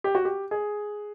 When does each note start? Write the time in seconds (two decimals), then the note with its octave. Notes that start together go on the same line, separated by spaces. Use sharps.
0.04 G4
0.15 F#4
0.25 G4
0.51 G#4